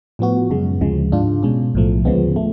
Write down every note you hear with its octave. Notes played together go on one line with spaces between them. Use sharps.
A2 F3 B3 F#4
F#2 C#3 G#3
D2 C#3 F3 G#3
G#2 G#3 D4 F4
B2 G#3 C#4
B1 A2 F3 A3
D2 C#3 F3 G#3 B3
A3